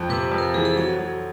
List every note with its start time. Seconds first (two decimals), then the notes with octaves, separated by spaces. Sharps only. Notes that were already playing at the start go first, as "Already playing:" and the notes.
Already playing: F2
0.09 C3 B4
0.32 F2
0.38 A#4
0.43 A4
0.54 E3 G#4
0.65 A4
0.76 F#3 A4
0.99 F#3